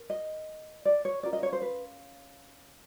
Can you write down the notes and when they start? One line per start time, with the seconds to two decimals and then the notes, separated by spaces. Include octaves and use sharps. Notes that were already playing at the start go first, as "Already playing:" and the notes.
Already playing: A#4
0.10 D#5
0.85 D5
1.05 C#5
1.23 C#4 F4 A#4 D5
1.33 D#5
1.43 C#5
1.53 C5
1.62 B4